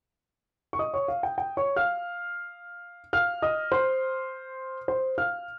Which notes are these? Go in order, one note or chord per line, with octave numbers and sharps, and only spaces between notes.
C#6
D#5 D#6
C#5 C#6
F5
G5
G5
C#5 C#6
F5 F6
F5 F6
D#5 D#6
C5 C6
C5 C6
F5 F6